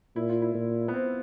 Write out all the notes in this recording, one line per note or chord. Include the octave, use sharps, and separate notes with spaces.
A#2 E4
F4
E4
A#2
B3
C4